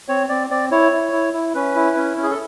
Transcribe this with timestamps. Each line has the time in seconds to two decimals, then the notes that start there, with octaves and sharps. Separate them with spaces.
0.08 C4 C#5
0.29 C4 D5
0.50 C4 D5
0.71 E4 C#5
0.92 E4
1.12 E4
1.33 E4
1.55 C#4 B4
1.76 E4
1.97 C#4
2.17 C#4
2.23 G#4
2.30 A4